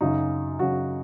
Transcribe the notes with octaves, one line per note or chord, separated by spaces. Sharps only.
F#2 C#3 F#3 D#4
F#2 C#3 F#3 F#4